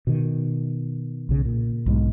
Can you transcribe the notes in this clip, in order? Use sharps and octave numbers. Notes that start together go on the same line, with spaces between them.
B2 D#3
B1 C#3
A#2
B1 G#2 G3 G#3